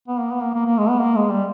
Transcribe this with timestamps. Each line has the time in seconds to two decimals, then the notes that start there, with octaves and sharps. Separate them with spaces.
0.08 B3
0.20 A#3
0.31 B3
0.42 A#3
0.54 A#3
0.66 A#3
0.78 G#3
0.89 B3
0.99 A#3
1.16 G#3
1.31 G3